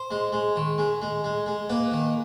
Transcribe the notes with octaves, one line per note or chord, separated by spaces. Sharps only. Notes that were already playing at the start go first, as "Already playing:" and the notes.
Already playing: C5
G#3
G#3
D#3
G#3
G#3
G#3
G#3
A#3 B4
D#3